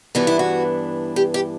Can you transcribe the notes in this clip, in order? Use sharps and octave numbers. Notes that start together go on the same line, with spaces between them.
G2 E3 B3 D4 F#4
E4
F#4
G4
G4